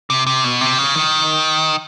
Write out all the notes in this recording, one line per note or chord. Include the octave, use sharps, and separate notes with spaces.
C3
C3
B2
C3
C#3
D#3